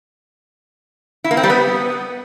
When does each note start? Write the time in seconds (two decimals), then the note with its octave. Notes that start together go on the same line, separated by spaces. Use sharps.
1.24 E4
1.31 A#3
1.37 C4
1.43 G3
1.50 B3